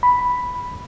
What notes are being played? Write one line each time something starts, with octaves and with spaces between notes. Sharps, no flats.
B5